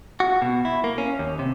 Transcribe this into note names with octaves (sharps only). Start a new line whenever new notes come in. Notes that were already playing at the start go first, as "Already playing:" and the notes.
F#4
B2
E4
A#3
C#4
D#2
C3